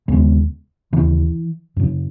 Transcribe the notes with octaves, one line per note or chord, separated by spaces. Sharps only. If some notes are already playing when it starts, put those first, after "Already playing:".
D#2 C#3 G#3 B3
D#2 C#3 E3
F#2 C#3